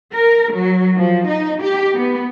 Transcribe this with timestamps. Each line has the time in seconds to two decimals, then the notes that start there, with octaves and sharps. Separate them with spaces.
0.14 A#4
0.53 F#3
0.97 F3
1.27 D#4
1.62 G4
1.95 B3